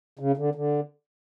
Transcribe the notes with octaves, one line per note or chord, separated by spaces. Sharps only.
C#3
D3
D3